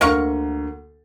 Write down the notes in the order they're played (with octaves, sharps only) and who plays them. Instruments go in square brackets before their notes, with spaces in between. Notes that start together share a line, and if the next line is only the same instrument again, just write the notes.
[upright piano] D2 D3 A#3 [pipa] A#4 F5 C#6